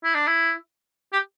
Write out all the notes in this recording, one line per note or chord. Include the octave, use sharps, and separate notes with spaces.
E4
D4
E4
G4